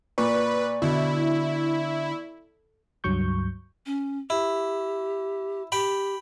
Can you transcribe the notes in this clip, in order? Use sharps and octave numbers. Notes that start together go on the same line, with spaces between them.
A#2 B4 D5 C#6
B2 D3 E4
C#2 G2 F#3 C#6 G6
C#4
E4 G4
G4 G5 B5